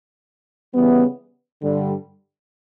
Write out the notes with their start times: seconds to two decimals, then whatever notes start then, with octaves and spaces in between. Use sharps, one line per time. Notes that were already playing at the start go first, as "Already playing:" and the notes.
0.73 C#3 E3 G3 B3
1.62 G2 D3 G3